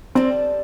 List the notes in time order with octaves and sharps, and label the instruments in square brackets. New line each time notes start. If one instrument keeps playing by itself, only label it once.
[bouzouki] G3 D4 A4 [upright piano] C4